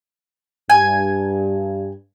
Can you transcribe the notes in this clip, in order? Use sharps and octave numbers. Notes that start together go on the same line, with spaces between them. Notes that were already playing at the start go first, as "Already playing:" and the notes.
G2 G#5